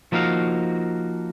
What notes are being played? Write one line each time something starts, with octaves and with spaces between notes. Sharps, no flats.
F3 A#3 D#4 F#4 F5